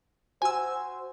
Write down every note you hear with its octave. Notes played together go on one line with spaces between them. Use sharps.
F#4 C5 G#5 E6